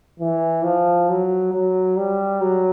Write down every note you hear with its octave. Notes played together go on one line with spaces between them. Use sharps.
E3
F3
F#3
F#3
G3
F#3